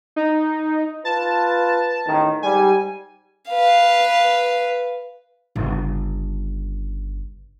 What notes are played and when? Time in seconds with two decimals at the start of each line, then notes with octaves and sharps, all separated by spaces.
0.16 D#4
1.05 F4 B4 A5
2.06 A1 D#3
2.43 G#2 G3 G#5
3.50 B4 F5
5.56 G1 C#3